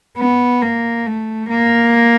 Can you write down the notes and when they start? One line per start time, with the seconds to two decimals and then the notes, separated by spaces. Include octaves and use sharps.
0.18 B3
0.62 A#3
1.06 A3
1.50 A#3